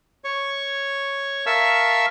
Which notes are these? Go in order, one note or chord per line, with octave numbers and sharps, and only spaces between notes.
C#5 C#6
A#4 E5 F5 A5 C#6 E6